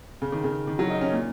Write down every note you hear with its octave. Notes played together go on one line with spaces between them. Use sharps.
C#3
D#3
C#3
D#3
F#3
D#4
C#4
A#2